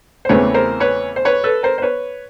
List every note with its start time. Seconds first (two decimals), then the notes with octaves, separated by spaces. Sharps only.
0.25 C5
0.29 E2 C#3 E3 A3 C4 B4 C#5
0.54 A#4 C5
0.80 B4 C#5
1.16 C5
1.25 B4 C#5
1.44 A4 B4
1.63 A#4 C5
1.78 C5
1.82 B4 C#5